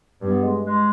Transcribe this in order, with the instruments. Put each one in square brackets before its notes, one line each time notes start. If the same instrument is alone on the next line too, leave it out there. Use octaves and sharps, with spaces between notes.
[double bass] G2 [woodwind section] B3
[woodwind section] G#3
G#3